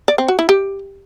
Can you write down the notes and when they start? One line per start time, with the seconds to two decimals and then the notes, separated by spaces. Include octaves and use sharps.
0.08 D5
0.18 C4
0.28 F#4
0.39 E4
0.49 G4